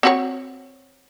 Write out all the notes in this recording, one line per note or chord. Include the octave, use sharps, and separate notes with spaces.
C4 F#4 C#5